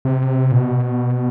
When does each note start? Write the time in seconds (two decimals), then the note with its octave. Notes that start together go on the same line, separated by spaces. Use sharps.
0.05 C3
0.52 A#2
0.55 B2